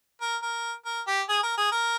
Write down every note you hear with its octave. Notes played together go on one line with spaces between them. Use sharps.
A#4
A#4
A#4
G4
G#4
A#4
G#4
A#4